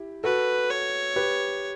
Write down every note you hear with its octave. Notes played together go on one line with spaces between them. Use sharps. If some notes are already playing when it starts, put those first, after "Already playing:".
Already playing: E4 G4
F#4 A4 B4
C#5
G4 B4